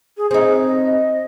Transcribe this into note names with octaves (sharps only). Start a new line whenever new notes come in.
G#4
C4 D#4 G#4
D#5